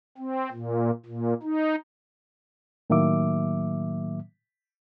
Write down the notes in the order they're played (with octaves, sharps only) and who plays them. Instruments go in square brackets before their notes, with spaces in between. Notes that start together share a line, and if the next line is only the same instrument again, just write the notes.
[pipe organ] C4
A#2
A#2
D#4
[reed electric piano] A2 D#3 F#3 A#3 E5 D6